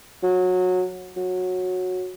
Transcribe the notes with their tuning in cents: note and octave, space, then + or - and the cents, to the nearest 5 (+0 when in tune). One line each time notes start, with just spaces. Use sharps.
F#3 -20
F#3 -15